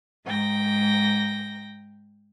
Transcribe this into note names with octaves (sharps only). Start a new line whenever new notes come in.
G#2 G5 A#6